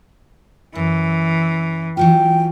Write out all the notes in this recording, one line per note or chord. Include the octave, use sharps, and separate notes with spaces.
F#2 E3
E3 F#3 F4 G5